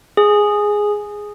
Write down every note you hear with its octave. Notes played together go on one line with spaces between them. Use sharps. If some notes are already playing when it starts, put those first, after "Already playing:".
G#4